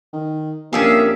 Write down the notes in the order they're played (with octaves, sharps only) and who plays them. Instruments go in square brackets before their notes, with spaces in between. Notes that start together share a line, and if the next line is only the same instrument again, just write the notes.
[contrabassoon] D#3
[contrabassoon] F2 [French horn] A#3 [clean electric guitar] C#4 D4 G4 [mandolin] G#4 E5 F5